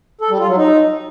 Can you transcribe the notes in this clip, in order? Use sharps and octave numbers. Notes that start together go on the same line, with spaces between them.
A4
G3
F4
F#3
D#4